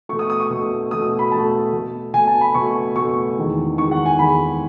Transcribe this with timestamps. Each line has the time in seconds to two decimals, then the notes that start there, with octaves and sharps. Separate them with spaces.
0.09 B2 A3 C#6
0.19 D#6
0.30 D#6
0.40 C#6
0.50 B2 A3
0.91 B2 A3 D#6
1.19 B5
1.32 B2 A3 A5
1.73 B2 A3
2.14 B2 A3 G#5
2.27 A5
2.41 B5
2.54 B2 A3 C#6
2.96 B2 A3 C#6
3.37 E2 D#3 G#3
3.78 E2 D#3 G#3 C#6
3.91 F#5
4.06 G#5
4.18 E2 D#3 G#3 B5